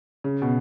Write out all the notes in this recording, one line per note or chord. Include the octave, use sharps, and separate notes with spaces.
C#3
B2